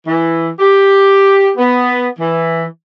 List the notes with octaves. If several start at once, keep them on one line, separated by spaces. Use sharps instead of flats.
E3
G4
B3
E3